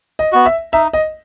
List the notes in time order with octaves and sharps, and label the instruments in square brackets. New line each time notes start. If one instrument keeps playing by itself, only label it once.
[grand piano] D#5
[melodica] B3 F#4
[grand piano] E5
[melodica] D#4 [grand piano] E5
[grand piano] D#5